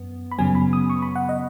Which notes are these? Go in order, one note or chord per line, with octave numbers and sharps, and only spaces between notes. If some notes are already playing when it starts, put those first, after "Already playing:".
Already playing: F#2 B3
B5
F#2 C#3 F#3 B3 G#5
B5
D#6
C#6
B5
F#5
D#5